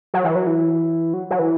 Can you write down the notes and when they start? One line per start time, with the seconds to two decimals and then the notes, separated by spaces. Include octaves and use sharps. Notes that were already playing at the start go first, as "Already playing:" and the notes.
0.14 F#3
0.24 E3
0.36 F#3
0.47 E3
1.14 F#3
1.31 F#3
1.39 E3